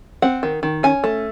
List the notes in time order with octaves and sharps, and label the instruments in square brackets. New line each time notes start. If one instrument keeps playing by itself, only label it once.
[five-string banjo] C4 F#5
D#3
D#3
C#4 G#5
A3